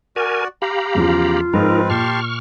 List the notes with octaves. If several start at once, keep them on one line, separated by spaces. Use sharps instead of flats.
F#4 A#4 D5 G#5
G4 F5 A#5 B5
E2 C#3 F3 F4
G#2 F3 C4 D#4 A#4 B4
A#2 G4 A5 C6 C#6 F6